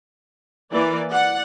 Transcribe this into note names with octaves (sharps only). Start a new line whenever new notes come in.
E3 A#3 D5
D5 F#5